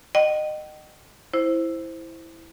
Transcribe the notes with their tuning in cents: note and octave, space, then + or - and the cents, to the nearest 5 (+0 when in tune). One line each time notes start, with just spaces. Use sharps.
D#5 -30 G5 -45
E4 +0 C5 +0